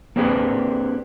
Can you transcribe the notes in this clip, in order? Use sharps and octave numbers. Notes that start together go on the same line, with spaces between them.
A#3 C4 D4 G4 G#4 B4